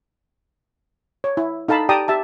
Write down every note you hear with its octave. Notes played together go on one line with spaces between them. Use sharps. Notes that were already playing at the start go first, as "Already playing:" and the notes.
C#5
E4
D#4 A4 F5 A5 B5
G4 D5 G5 A5 A#5 D#6
G4 E5 A5